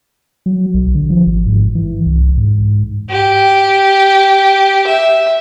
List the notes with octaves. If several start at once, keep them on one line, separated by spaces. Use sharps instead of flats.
F#3
B1
D3
F3
G#1
G#2
E3
C2
G#2
G4
E5